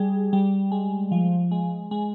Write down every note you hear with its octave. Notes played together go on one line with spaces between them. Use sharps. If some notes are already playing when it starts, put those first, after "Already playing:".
Already playing: G3 G#4
G3
G#3
F3
G#3
G#3